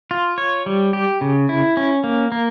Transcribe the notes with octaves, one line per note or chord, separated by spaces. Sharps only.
F4
C#5
G3
G4
C#3
E4
C#4
A#3
A#3